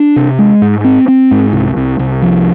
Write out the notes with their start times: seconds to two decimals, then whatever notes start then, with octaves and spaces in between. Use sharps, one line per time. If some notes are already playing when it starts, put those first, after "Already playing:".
Already playing: D4
0.16 C3
0.39 G#3
0.61 G#2
0.84 C4
1.08 C4
1.31 G#2
1.53 C2
1.76 C2
1.99 C2
2.22 F3